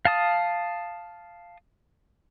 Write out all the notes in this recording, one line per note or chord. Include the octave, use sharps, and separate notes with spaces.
F5 A5 D#6